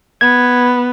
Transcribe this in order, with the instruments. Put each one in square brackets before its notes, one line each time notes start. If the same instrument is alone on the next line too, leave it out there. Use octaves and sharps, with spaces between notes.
[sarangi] B3 [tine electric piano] G#6